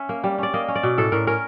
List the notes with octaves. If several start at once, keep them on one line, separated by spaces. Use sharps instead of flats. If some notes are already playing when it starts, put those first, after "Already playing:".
Already playing: C#4 E5
A#3
G3
C#4 D5
A#3 D#5
C#4
D5
B2
A2 A4
A2 A#4
C#4 A#4